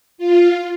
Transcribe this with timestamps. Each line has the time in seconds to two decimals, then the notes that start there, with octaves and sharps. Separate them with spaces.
0.18 F4